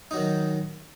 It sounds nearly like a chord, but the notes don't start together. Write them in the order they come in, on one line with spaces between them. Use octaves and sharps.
D#4 F#3 D#3